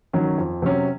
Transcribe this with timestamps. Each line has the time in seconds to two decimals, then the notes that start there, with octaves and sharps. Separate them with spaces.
0.13 D#3 F#3 C#4
0.38 F2
0.62 C3 F#3 C#4